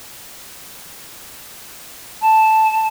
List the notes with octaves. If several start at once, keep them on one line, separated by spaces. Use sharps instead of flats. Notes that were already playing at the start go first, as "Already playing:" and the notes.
A5